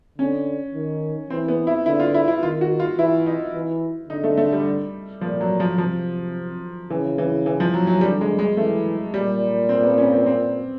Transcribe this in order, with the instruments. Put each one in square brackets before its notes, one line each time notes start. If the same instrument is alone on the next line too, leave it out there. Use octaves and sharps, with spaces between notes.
[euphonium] D3 [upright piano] C#4
[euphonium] D#3
[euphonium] E3 [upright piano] C4
[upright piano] B3
E4
[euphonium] D3 [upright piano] E4
[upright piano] F4
E4
E4
[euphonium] D#3 [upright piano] F4
[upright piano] F#4
F4
[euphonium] E3 [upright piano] E4
[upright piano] D#4
[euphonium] E3
[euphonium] D3 [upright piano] D#4
[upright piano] A3
A3
G3
[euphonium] A#2 [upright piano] F3
[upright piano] F#3
F3
[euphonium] C3 [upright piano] F3
[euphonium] C#3 [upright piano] E3
[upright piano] E3
E3
F3
F#3
F#3
[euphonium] D3 [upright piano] G3
[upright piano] G#3
G#3
[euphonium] E3 [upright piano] A3
[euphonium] A#2 [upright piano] G3
[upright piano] C4
B3
C#4
C4
C4